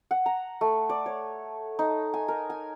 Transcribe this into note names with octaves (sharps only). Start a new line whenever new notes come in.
F#5
A#5
A3
D5
C#5
D#4
G#5
A#4
G#5